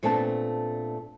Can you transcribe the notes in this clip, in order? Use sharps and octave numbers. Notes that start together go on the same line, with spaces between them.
A#2 A3 B3 C4 D4 A5